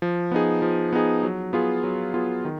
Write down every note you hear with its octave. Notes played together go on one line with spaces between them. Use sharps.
F3
B3 D#4 G#4
F3
B3 D#4 G#4
F#3
B3 F4 G#4
F#3
B3 F4 G#4
D#3